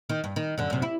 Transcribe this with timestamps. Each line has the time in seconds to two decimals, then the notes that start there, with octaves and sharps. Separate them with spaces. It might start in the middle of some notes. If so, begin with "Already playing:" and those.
0.09 D#3
0.24 G2
0.36 D#3
0.58 F#2 D3
0.70 F#2 C3
0.82 E4